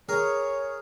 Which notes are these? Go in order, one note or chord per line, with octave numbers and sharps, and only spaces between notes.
G#4 A#4 C#5